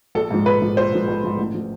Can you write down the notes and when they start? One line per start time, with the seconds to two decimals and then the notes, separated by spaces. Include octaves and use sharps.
0.15 A#1 A4
0.31 G#2 F3
0.46 A#1 B4
0.62 G#2 F3
0.77 A#1 C5
0.93 G#2 F3
1.08 A#1
1.24 G#2 F3
1.38 A1
1.54 F3